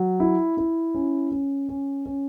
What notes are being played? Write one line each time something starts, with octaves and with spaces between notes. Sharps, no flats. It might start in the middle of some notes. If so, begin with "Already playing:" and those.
Already playing: F#3
E4
E4
C#4
C#4
C#4
C#4